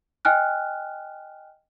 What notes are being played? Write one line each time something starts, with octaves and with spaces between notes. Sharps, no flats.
D#5 G5 G#5 F6 F#6